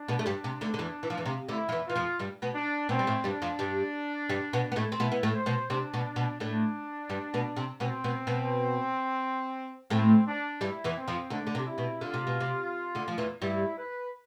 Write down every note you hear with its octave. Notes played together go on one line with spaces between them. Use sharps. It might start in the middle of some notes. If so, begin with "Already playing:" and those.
Already playing: D4
B2 B3
A3
G2 G3
C3
D2 D3
D3
E2 E3
E3
F3
E2 E3
C3
D2 D3 E4
F3
E2 E3
E3 F4
F2 F3
G2 G3
B2 B3
D4
B2 B3 C4
G3
A2 A3
G2 G3 D4
F2 F3
G2 G3
G2 G3
B2 B3
B3
A2 A3
C4
B2 B3 E4
B3
A2 A3
C5
B2 B3
C3 C4 D4
B2 B3
B2 B3
A2 A3 D4
G2 G3
B2 B3
C3 C4
B2 B3 C4
B2 B3
B2 B3
A2 A3 C4
D4
G2 G3 E4
E2 E3
C4
F2 F3
D2 D3 D4
D3
C3
E4
B2
D3 F4
C3
B2
C3
D2 D3
F3
E2 E3
G2 G3 E4
B4